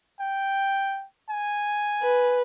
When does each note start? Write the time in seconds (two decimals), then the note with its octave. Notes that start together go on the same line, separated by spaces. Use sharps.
0.20 G5
1.30 G#5
2.02 B4